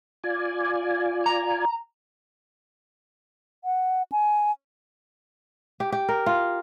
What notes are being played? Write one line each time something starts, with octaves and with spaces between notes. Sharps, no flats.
F4 D5 G#5
A#5
F#5
G#5
G4
G4
A#4
F4